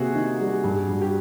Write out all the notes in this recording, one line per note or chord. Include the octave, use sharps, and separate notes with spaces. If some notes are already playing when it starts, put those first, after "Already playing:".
Already playing: C3 A#3 F#4 G#4
D#3
G3
G2
G2
G4